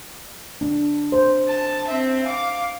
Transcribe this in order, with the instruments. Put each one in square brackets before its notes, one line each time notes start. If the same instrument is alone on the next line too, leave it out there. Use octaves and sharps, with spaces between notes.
[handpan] D4
C5
[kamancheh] A5
C4 E5
F5 D6